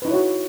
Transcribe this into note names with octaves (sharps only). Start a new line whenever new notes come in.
D#4 E4 F#4 B4 C#5